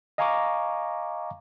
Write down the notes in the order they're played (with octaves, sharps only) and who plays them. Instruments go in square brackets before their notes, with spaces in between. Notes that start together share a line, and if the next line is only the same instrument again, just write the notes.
[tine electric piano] D#5 F5 G#5 A#5 C#6 D6